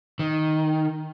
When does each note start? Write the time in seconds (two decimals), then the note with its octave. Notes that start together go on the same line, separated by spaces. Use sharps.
0.19 D#3